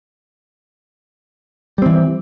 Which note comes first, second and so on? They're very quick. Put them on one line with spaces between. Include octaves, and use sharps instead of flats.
G3 C4 E3